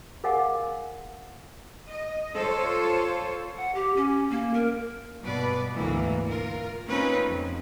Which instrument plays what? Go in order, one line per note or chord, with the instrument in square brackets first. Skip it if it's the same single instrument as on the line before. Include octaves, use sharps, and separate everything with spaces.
[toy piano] G#4 A#4 D#5 F5 F#5 G#5
[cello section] D#5
F4 A4 C5 C#5
[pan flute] F#5
G4
C#4
A#3
A#4
[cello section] G2 B2 B4 D5
D2 G#2 B2 E3 A#3
F4 A#4
A#3 C4 C#4 D#4 F4 B4
F2